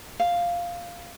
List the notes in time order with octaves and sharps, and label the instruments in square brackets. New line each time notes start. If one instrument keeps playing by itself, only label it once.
[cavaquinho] F5